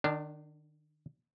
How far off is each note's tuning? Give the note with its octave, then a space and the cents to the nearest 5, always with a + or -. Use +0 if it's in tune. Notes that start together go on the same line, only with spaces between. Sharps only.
D#3 -35 D4 +0